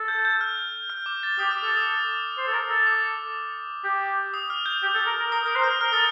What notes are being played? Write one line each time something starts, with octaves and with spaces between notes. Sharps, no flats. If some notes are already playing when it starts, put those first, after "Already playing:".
Already playing: A4
G6
G6
F6
F6
D6
A6
G4 D#6
F6
A4 D6
D#6
C5
A4
A#4
A4
D6
G4
D#6
F6
G6
G4
A4
A#4
A#4
A#4 D#6
A#4 D#6
C5
F6
A#4 F6
A4 D#6